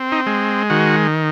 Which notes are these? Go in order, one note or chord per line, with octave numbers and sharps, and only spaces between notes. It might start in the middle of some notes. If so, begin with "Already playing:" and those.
Already playing: C4
D#4
G#3
D#3 F#4